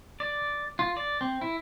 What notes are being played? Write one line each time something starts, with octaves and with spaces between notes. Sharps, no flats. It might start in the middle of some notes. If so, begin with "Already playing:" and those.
D5
F4
D5
C4
E4